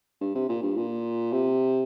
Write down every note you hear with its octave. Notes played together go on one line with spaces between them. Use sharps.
G2
C3
A#2
G2
A#2
C3